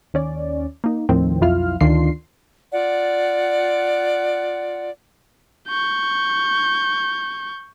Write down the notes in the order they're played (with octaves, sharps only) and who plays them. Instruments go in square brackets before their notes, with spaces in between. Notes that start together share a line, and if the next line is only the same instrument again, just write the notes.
[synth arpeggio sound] D#2 C#4 D5
A#3 D#4
D#2 A2 D#3 F3 C4
B1 F2 E4 F4 F5 F6
D2 D#3 D4 F4 C6 C7
[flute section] F4 D5 F#5
[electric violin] C#6 G6